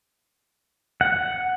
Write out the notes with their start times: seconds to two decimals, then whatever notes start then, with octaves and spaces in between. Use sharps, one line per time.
1.01 F#5